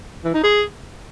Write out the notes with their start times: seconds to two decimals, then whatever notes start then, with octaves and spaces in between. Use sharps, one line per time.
0.24 E3
0.34 D#4
0.43 G#4